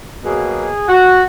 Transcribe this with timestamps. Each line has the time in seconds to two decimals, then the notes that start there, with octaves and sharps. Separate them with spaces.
0.23 B2 F#3 A#3 G#4
0.88 F#4